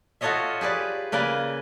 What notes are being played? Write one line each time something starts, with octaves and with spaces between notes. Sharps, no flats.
F4 F#4 A4 C#5 D#5 E5
G4 G#4 B4 D5
C#3 A#3 B4 D5 G#5